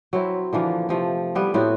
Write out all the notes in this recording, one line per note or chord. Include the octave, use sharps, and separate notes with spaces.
F#3 C4 E4
D3 E3 F3 A#3
C3 F3 A3
G3 B3 E4
A2 B3 C4 F#4